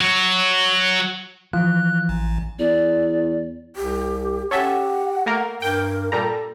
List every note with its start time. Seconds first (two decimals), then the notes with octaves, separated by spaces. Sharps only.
0.01 F#3 F#4
1.53 E3 F3 F#6
2.09 A1
2.59 E2 D5
3.76 C2 G4
4.51 C#4 G4 A4 E5 F#5
5.26 A3 A#3 A#4
5.62 G2 A#4 G5
6.12 A#2 G3 A4 A#5